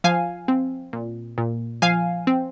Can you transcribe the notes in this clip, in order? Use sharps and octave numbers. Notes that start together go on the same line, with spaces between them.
F3 F5 G#5
C4
A#2
A#2
F3 F5 G#5
C4